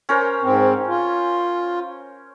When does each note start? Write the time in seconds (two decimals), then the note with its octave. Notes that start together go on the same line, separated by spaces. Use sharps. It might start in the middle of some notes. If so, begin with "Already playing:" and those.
0.09 C#4 A#4 C5
0.43 G#2 C4
0.87 F4